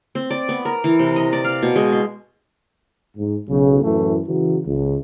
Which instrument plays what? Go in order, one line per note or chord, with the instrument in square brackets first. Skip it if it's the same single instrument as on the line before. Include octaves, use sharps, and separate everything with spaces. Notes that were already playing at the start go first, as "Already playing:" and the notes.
[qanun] C4
D5
B3
A#4
E3
C3
D#5
D5
F5
B2
G#3
C6
[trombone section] G#2
B1 C#3
F#2 A2 E3 A3
C#3 E3 F#3
C#2